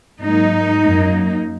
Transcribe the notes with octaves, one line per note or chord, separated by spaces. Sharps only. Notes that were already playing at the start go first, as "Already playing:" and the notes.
G#2 F#3 A#3 D#4
F#2 F#3 A#3